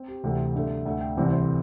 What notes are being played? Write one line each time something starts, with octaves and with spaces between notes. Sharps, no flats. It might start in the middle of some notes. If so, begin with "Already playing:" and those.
Already playing: C4
G4
D2 C3 E3 A3 C4
G2 D3 A3
D2 D3 A3 A4
G5
C2 C3 E3 C4
C5